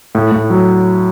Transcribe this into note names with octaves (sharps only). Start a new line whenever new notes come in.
A2
A2
F#3